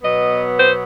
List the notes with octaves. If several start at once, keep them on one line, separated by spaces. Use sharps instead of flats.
B2 F#3 B3 D#5
C5